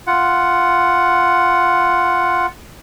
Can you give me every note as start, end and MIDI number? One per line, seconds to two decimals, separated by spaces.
0.07 2.46 65
0.07 2.46 78